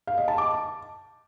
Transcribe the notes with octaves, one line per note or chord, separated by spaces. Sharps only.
F5
D#5
A5
D6
A5